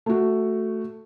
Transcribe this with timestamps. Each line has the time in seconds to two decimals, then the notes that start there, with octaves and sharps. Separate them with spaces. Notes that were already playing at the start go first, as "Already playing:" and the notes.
0.06 A3 F#4